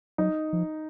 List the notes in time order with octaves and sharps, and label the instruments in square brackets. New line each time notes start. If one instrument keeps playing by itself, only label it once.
[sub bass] F#3 [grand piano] D#4
[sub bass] F3